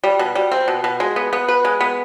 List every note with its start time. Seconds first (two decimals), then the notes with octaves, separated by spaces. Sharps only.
0.04 G3
0.19 B2
0.35 G3
0.52 C4
0.68 B2
0.84 B2
1.00 G#3
1.16 B3
1.33 B3
1.48 B4
1.65 G#3
1.81 B3